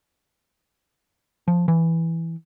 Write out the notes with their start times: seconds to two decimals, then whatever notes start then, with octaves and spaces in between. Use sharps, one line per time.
1.48 F3
1.68 E3